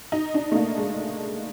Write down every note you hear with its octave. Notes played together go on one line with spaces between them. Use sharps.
D#4
D4
A3
A#3
G#3